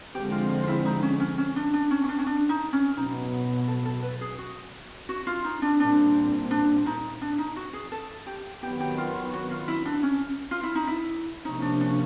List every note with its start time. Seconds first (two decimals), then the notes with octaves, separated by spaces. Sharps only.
0.14 D3 F3 G#3 C4 G4
0.32 F4
0.49 F4
0.63 F4
0.68 E4
0.85 D#4
1.03 C#4
1.20 C#4
1.38 C#4
1.56 D4
1.74 D4
1.91 C#4
2.04 C#4
2.09 D4
2.19 C#4
2.27 D4
2.49 D#4
2.73 C#4
2.97 B2 F#3 B3 D#4
3.68 A4
3.85 A4
4.02 B4
4.21 G#4
4.38 F#4
5.09 F#4
5.27 F4
5.44 D#4
5.62 D4
5.80 A#2 G3 C4 D4
6.51 D4
6.86 D#4
7.22 D4
7.38 D#4
7.56 F#4
7.73 G#4
7.92 A4
8.27 G4
8.62 D#3 F#3 B3 G4
8.81 G4
8.98 F4
9.34 F#4
9.51 F4
9.68 E4
9.86 D4
10.03 C#4
10.51 F4
10.63 E4
10.75 D#4
10.87 E4
11.45 C3 F3 A#3 C#4 D#4
11.62 D4
11.81 D4